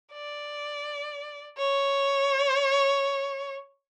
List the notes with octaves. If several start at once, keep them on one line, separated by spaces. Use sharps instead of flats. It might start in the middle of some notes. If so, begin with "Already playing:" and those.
D5
C#5